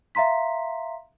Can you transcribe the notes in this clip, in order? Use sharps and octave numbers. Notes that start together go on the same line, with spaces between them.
E5 F5 A#5 C6 B6